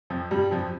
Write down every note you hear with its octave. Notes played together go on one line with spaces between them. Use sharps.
F2 F3
G2 G3
F2 F3